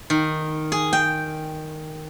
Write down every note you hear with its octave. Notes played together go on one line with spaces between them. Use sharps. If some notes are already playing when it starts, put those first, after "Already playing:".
D#3
G#4
G5